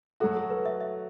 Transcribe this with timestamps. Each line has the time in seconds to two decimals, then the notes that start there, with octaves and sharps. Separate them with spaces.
0.20 F#3 A3 F#4 A4
0.35 A4
0.50 B4
0.66 E5
0.81 E5